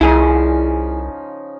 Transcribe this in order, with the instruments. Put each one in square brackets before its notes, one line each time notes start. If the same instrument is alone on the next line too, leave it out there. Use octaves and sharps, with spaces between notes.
[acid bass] C2 [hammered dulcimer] C#3 F3 D#4 [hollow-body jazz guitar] E4 G#4